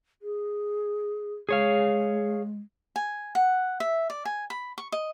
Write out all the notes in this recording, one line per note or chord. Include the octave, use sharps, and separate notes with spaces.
G#4
G#3 G#4 C#5 F5
G#5
F#5
E5
D5
G#5
B5
C#6
D#5